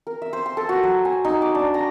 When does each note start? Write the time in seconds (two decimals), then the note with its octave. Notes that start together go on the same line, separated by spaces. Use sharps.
0.07 A#4
0.22 E5
0.33 C5
0.46 C6
0.57 A4
0.69 F#4
0.83 F#3
1.05 G#5
1.25 D#4
1.42 D6
1.55 D4
1.74 A#5